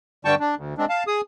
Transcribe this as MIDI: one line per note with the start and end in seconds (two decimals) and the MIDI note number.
0.25 0.35 43
0.25 0.35 50
0.25 0.35 55
0.25 0.35 79
0.25 0.35 81
0.25 0.35 85
0.40 0.55 62
0.56 0.74 38
0.78 0.85 56
0.78 0.85 60
0.78 0.85 62
0.89 1.03 77
0.89 1.03 81
1.07 1.21 68
1.07 1.21 87